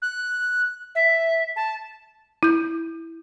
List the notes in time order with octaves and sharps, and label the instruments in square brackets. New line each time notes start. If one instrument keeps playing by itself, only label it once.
[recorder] F#6
E5
A5
[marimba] E4 G6